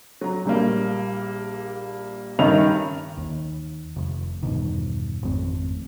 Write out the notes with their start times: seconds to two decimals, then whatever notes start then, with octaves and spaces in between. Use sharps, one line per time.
0.21 F#3 A#5
0.45 A#1 G3 A#3
2.39 G2 D#3 C#4 E5 A#5 F7
3.17 D#2
3.96 F1
4.43 E1 G2 B2 D#3
5.23 G#1 F2 A3 C4